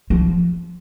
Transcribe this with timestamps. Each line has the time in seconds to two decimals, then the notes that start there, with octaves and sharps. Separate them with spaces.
0.10 F3